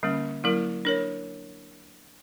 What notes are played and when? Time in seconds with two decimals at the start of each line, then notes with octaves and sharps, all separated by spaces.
0.03 D3 G3 A#3 C#4
0.44 F#3 A#3 E4 A#4
0.85 D4 A#4 C#5